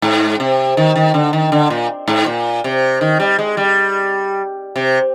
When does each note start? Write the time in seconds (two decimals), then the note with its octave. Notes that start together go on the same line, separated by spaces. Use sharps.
0.02 G#2
0.40 C3
0.77 D#3
0.96 D#3
1.14 D3
1.33 D#3
1.52 D3
1.70 A#2
2.08 G#2
2.26 A#2
2.64 C3
3.01 D#3
3.20 G3
3.39 G#3
3.57 G3
4.76 C3